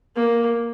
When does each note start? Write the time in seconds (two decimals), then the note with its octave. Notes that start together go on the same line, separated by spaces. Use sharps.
0.16 A#3